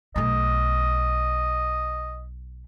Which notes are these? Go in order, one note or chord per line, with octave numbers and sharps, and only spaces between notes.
B1 A3 D#5